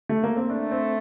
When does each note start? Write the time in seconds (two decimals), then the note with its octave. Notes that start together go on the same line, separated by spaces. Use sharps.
0.09 A3
0.24 A#3
0.36 C4
0.50 A3 D4
0.71 C4